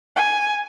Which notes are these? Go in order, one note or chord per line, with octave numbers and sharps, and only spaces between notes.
G#5